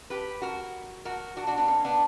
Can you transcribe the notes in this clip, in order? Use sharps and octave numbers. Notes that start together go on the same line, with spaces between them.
G4 B4
F#4 A#4
F#4 A#4
D4 F#4
D4 F#4
B3 D4
A#3 C#4
B3 D4